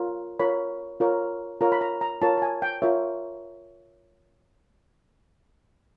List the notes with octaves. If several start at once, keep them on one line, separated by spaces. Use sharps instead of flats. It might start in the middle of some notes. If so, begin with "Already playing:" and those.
Already playing: F4 A#4 C#5
F4 A#4 C#5 B5
F4 A#4 C#5
F4 A#4 C#5 A#5
B5
A#5
A#5
F4 A#4 C#5 A5
A5
G#5
G5
F4 A#4 C#5 E5